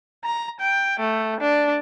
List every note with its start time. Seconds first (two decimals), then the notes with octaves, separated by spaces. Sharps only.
0.24 A#5
0.60 G5
0.99 A3
1.41 D4